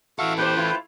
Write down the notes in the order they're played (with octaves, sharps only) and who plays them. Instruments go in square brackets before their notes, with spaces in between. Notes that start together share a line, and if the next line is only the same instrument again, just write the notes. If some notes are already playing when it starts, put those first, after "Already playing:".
[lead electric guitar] E3 A4 [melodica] F#4 E5 F5
[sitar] A#2 G4 C5 [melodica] B4 G5
[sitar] A3 E4 F4